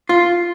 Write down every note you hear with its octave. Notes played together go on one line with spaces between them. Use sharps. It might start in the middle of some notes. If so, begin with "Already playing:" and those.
F4